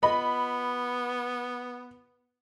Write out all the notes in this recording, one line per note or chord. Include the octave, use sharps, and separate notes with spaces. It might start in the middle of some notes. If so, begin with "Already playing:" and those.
B3 F4 D#5 B5